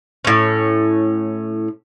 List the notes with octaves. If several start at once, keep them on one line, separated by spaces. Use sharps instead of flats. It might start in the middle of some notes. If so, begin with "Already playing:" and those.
A2 C#4